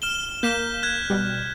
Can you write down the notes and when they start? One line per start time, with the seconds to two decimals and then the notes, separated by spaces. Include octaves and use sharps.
0.02 F6 E7 G7
0.43 A#3 G6 B6 E7
0.83 F#6 G#6
1.10 B2 G3